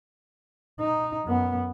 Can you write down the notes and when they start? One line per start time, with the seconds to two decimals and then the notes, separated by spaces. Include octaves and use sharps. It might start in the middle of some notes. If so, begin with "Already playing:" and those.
0.80 D#4
1.25 F#2 B3